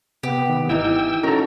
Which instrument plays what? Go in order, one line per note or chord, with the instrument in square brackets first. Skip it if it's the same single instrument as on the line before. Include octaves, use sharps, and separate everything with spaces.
[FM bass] C3 [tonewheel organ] B3 [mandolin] G4
[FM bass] D#3
[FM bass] G#1 [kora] E3 D#4 [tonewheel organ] G5 E6
[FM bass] C#4 [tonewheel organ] D#4 F#4 A#5 [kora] A4 A#4